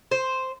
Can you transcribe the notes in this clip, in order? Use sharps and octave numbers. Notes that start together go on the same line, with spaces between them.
C5